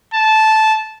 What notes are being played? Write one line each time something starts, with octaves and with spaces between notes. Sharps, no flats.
A5